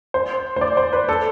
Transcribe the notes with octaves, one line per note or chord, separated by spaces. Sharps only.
C5
C5
D5
C5
B4
A4